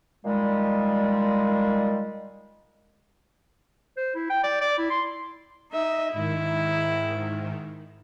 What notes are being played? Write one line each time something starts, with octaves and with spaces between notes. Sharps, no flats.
A#2 D#3 G3 G#3
C5
E4
G5
D5
D5
E4
C6
D#4 D#5 E5
G#2 D#3 E4